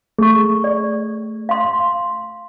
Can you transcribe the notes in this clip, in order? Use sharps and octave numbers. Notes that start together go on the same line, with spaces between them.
A3 G#4 C#6
D5
F5 C6